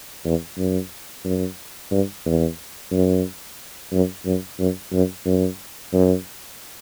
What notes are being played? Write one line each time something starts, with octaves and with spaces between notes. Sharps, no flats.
E2
F#2
F#2
G2
E2
F#2
F#2
F#2
F#2
F#2
F#2
F#2